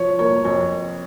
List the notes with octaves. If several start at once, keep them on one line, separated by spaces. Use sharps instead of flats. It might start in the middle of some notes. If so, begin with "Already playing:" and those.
Already playing: F3 C#5
A#3 C#5
F2 C#5